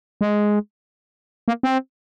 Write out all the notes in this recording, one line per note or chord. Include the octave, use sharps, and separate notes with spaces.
G#3
A#3
C4